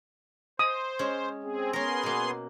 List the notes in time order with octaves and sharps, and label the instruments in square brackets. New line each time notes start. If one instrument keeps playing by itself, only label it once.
[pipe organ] C5 [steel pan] D#6
[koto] G#3 C#4
[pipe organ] C4 G#4
[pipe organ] B3 G#4 C6 [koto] C#4 A#4
[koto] B2 A#3